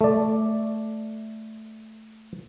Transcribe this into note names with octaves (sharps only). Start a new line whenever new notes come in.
A3 D5